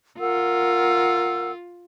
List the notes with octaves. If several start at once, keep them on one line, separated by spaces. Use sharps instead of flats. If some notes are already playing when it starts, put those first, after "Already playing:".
F4 A#4 F#5 E6